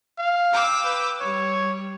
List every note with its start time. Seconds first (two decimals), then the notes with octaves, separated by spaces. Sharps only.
0.18 F5
0.52 G5 D6 E6
0.85 B4
1.20 G3 C#5